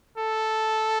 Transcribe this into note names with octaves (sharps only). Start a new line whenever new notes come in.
A4